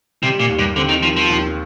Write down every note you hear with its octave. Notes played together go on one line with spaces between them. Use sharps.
C3 G3
A#2
D#2
G2
D3 C4
D#3
D#3 F3
F3
D#2